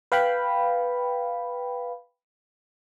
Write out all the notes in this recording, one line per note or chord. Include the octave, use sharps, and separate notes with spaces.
B4 F5 G5 B5